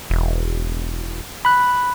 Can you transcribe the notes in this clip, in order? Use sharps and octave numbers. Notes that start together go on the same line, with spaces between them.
E1
B5 F#6